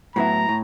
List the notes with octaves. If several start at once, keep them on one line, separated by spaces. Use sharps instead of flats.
A2 F#3 B3 E4 A#5
A2